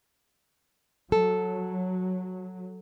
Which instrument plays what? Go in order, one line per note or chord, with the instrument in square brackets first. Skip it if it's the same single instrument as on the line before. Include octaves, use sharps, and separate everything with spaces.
[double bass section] F#3 [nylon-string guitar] A4